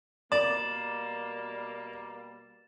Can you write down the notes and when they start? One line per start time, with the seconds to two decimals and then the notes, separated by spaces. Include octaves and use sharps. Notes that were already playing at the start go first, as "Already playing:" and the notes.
0.32 B2 G3 A#3 D5 A6 E7